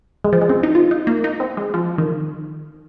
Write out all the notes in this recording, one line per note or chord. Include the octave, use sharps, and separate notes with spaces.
G#3
F3
G#3
C4
D#4
F4
D#4
A#3
D#4
C4
G#3
F3
D#3